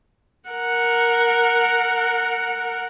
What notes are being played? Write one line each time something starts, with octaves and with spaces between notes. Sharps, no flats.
A#4 F#5